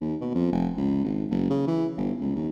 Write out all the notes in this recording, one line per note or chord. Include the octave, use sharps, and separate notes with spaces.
D#2
B2
F2
F1
C#2
G#1
F#1
C#3
E3
G1
C#2
D#2